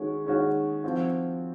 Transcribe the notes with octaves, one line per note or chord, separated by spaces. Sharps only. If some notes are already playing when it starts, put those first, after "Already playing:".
Already playing: D#3 G#3 C#4 F#4
D#3 G#3 C#4 F#4
F3 C4 F#4